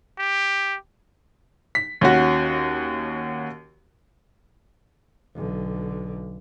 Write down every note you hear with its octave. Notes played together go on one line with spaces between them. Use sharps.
G4
B6
D#2 C#4 F#4
B1 D3